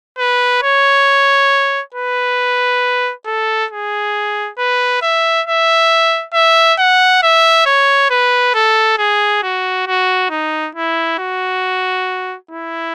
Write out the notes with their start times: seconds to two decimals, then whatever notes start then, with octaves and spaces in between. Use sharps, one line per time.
0.18 B4
0.62 C#5
1.94 B4
3.26 A4
3.71 G#4
4.58 B4
5.02 E5
5.46 E5
6.34 E5
6.79 F#5
7.23 E5
7.66 C#5
8.10 B4
8.54 A4
8.98 G#4
9.43 F#4
9.87 F#4
10.30 D#4
10.75 E4
11.18 F#4
12.51 E4